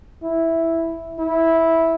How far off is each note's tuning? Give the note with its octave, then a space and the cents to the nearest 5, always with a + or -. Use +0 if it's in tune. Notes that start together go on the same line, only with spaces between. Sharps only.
E4 -5
E4 -10